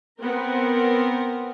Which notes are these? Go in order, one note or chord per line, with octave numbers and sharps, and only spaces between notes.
B3 C4 A#4